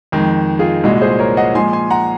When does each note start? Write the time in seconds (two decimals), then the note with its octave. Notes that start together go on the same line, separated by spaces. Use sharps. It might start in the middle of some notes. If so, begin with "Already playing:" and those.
0.12 F2 D#3 G#3
0.59 F4 G#4
0.84 C2 A#2 G#3 F#4
1.01 G#4 C5
1.19 A#4 C#5
1.37 D#5 F#5
1.55 A#2 F3 G#3 G#5 C6
1.73 G#5 C6
1.90 F#5 A#5